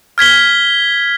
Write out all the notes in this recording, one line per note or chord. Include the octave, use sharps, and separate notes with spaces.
F6 G#6 B6 G7